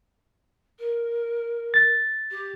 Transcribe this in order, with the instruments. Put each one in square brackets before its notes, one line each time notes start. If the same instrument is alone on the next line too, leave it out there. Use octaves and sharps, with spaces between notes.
[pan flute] A#4
[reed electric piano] A6
[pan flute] G4